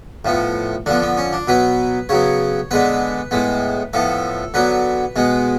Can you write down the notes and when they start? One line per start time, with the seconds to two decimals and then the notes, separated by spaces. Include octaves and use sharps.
0.25 A2 F3 B3
0.86 D3 F3 B3 D4
1.02 B3
1.17 C#4
1.33 D4
1.48 B2 F#3 B3 B4
2.09 C#3 F#3 B3 C#5
2.71 D3 G#3 B3 B4
3.31 A2 G#3 B3
3.93 A2 F3 B3 A4
4.54 D3 F#3 B3 B4
5.16 B2 G#3 B3